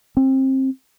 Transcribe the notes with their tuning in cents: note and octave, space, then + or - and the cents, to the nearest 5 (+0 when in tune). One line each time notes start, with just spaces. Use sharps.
C4 +25